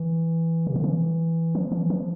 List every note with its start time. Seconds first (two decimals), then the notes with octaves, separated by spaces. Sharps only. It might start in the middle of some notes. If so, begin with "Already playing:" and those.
Already playing: E3
0.67 C3
0.76 D3
0.84 E3
1.55 F3
1.72 E3
1.90 F3